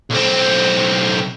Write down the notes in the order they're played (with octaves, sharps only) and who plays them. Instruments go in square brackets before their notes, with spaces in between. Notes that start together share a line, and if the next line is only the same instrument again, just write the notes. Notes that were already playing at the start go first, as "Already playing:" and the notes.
[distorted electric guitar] B1 C4